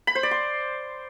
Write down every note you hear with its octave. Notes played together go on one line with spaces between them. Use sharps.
B5
C5
D5
C6